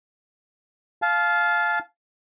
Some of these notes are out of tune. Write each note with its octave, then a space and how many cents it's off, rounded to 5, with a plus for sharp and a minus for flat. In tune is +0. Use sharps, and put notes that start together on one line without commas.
F5 +0 A5 -30